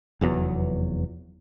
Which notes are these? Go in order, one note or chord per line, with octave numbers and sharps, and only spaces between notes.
F1 E2 F#3 B3